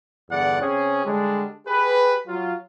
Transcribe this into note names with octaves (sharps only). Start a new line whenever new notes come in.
E2 G2 D3 D5 F#5
C3 C4 C#4 G#4
D3 G3 G#3 D4
G4 G#4 B4
F#3 F4